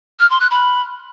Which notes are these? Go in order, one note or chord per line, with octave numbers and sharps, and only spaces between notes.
F6
C6
F#6
B5